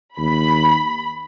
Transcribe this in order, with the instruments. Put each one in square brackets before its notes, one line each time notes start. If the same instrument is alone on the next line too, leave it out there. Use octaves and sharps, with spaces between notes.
[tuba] D#2 [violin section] B5